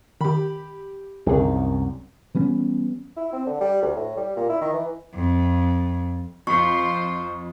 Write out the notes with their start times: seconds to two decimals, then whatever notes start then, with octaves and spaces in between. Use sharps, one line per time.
0.21 D#3 G4 B5
1.26 G1 C2 F#2 D#3 G#4
2.35 E3 G3 B3 C#4
3.17 E4
3.33 C4
3.47 D3
3.61 G3
3.82 D2
3.97 A2
4.17 G3
4.36 A#2
4.50 E4
4.61 D#3
4.74 E3
5.15 F2
6.47 F2 F4 C5 B5 C#6 B6